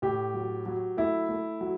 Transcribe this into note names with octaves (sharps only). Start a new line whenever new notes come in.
A2 G4
F#3
F#3
A3 E4
A3
F#3